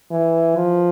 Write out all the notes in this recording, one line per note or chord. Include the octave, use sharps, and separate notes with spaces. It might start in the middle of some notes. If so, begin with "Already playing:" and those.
E3
F3